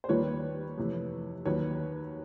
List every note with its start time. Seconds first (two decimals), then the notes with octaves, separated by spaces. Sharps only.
0.04 C5
0.09 D#2 D#3 G3 A#3 B4 C#5
0.78 F2 C3 E3 A3
1.46 D#2 D#3 F#3 A#3 B4 C#5